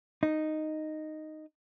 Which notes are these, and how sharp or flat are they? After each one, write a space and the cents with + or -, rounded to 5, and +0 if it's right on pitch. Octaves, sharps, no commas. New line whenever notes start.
D#4 -5